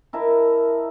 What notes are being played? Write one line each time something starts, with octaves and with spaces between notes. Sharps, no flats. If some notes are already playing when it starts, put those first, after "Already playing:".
E4 A#4 D#5 A5